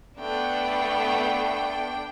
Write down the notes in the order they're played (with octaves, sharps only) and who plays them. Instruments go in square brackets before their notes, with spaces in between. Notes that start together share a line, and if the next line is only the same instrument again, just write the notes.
[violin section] A3 B3 [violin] D4 G5